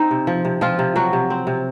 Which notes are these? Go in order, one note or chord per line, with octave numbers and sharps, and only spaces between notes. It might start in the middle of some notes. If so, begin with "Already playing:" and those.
Already playing: C4 D#4
C3
F3
C3
F3 C4 F4
C3
F3 F#3 F#4
C3
C4
C3